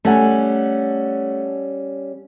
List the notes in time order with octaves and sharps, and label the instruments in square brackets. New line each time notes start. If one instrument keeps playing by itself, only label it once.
[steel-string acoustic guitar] G3 C#4 [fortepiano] A3 F#5 G#5